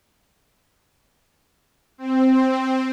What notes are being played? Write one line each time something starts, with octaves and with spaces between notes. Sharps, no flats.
C4